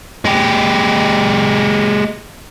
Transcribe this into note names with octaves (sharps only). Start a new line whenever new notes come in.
G#3 G4